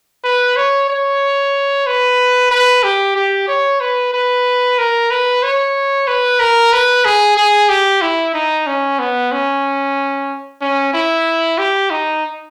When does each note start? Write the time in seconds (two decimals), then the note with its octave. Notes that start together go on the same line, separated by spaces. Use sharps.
0.24 B4
0.57 C#5
0.89 C#5
1.87 B4
2.52 B4
2.83 G4
3.16 G4
3.48 C#5
3.81 B4
4.14 B4
4.79 A#4
5.11 B4
5.43 C#5
6.08 B4
6.40 A#4
6.73 B4
7.05 G#4
7.37 G#4
7.69 G4
8.02 E4
8.34 D#4
8.67 C#4
8.99 B3
9.32 C#4
10.61 C#4
10.94 E4
11.58 G4
11.91 D#4